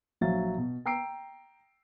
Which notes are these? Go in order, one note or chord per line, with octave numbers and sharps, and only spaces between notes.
A#1 F#3 E5 F5 A6
B2
G5 A#5 E6 C7 D7